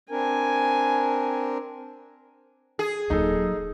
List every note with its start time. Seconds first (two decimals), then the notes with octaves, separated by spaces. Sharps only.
0.10 C4 D4 A#4 G#5
2.79 G#4
3.10 D#1 F#3 D#4 A4